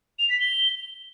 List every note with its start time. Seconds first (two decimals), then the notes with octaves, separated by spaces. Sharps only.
0.19 F7
0.30 B6
0.40 G7